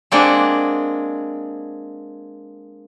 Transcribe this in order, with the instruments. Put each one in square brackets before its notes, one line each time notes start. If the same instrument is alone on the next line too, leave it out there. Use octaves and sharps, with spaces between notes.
[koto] G#3 A#3 C4 D4 G#4 F#5